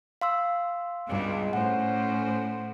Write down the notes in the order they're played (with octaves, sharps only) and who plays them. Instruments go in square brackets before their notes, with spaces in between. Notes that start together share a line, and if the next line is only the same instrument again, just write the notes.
[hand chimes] F5 C6 E6
[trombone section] C#2 [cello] G2 B2
[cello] A2 [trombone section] C#4 C5 [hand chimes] F#5